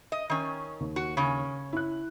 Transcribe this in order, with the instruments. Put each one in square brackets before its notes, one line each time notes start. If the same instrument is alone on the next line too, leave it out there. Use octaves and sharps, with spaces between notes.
[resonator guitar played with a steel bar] D#5
D#3 C#4
[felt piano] D#2
[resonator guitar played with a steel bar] F#4
C#3 C#4
[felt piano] E4 F#6